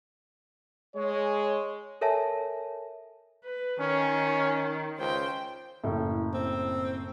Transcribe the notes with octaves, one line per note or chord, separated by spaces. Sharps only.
G#3 C#5
A4 A#4 C#5 E5 G#5 A5
B4
D#3 C#4
C#2 C5 G5
F#1 A2
C4